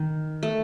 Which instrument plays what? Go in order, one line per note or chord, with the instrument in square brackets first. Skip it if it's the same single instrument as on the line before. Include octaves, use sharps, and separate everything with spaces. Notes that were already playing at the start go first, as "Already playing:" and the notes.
Already playing: [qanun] D#3
A3